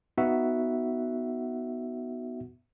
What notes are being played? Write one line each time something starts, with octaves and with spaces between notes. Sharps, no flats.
B3 D#4 F#4 E5 F#5